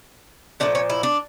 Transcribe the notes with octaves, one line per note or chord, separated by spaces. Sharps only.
A#2 F3 A3 D4
C#4
E4
D4